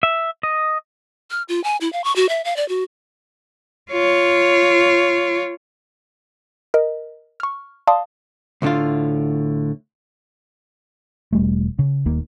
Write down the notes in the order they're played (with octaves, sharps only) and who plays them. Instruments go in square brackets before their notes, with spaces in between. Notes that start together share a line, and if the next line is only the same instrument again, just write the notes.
[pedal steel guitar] E5
D#5
[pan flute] F6
F4
G#5
E4
F5
C#6
F#4
E5
F5
D5
F#4
[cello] F4 C#5
[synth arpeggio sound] A#4 D#5
C#6 F6
D5 F5 A5 C6 D6 D#6
[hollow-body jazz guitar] D2 A2 D3 D4 F4
[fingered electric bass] E1 G3 A3
C#3
D#1 D#2 A#3